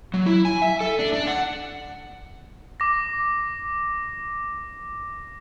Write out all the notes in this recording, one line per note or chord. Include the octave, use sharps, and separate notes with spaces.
F#3
E4
G#5
E5
A4
D4
D4
F#5
D6 A#6